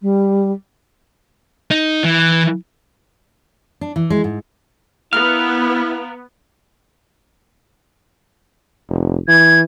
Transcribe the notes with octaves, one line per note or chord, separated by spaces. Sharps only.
G3
D#4
E3
D4
E3
G#3
G#2
B3 E4 A#4 F5 F6
F1
E3 G#6